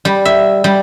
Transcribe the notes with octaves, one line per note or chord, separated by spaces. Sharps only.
G3
E5
G3